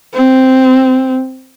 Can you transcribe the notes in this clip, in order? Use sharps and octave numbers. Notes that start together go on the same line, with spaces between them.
C4